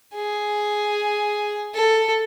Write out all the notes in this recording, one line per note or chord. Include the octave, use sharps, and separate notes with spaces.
G#4
A4